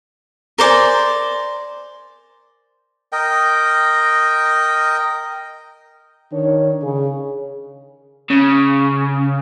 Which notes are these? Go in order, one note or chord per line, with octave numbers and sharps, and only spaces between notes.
A#4 C5 D5 G#5
A#4 D#5 G5
D#3 D4 C#5
C#3 G#4
C#3